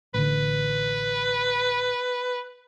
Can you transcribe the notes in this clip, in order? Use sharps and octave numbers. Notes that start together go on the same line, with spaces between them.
A1 D3 B4